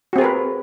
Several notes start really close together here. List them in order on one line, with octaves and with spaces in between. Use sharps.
F#4 C4 G#4 A#4 B4